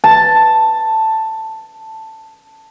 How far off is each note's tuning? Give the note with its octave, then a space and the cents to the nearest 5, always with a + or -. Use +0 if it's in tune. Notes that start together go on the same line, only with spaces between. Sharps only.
A5 +5